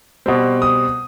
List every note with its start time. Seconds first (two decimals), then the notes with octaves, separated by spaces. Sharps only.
0.26 B2 G3 C4
0.62 D#6